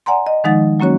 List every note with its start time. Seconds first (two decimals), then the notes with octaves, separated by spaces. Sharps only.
0.06 D5 F#5 G#5 A#5 C6
0.27 D#5
0.44 D#3 F3 G#3 D#4 F#5 A6
0.80 F#3 A#3 C#4 F#4 C#5